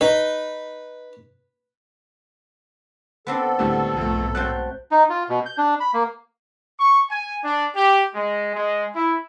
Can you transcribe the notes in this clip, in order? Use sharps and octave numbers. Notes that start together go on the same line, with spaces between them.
D#4 B4
B3 C4 D4 A4
C#2 A2 D3 G3 G#3
B1 F2 G#2 A3
F#3 A3 C4 F#6 G6
D#4
F4
B2
G6
D4
B5
A#3
C#6
G#5
D4
G4
G#3
G#3
E4